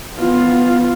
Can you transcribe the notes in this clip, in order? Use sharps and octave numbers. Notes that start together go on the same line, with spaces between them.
B3 F4